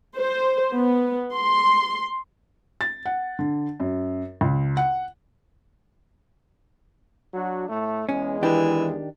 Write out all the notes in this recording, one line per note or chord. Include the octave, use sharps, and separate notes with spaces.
C5
B3
C6
A6
F#5
D3
F#2
C#2
F#5
F#3 D4 F#4
A2 A3
E2 G#3 C#4
D#3 E3 D4 G4